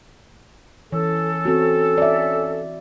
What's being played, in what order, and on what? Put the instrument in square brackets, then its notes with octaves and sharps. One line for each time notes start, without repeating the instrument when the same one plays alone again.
[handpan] E3 [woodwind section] C#4 A4
[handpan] C4 F#4
D5 E5